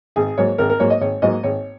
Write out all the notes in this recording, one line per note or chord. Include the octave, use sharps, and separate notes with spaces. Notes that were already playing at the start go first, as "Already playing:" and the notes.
G#1 G#4
G#2 F#3 A#3 C#5
G#1 A#4
A#4
G#2 F#3 A#3 C#5
D#5
G#1 C#5
G#2 F#3 A#3 D#5
G#1 C#5